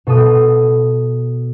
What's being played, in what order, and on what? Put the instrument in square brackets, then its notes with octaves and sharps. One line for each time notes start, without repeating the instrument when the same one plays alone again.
[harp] B2 A4 D#6